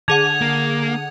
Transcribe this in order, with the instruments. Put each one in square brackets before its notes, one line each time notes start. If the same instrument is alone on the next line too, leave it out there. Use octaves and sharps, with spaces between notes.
[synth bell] D3 G#4 F#5 [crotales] G#6 F7
[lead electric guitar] A#3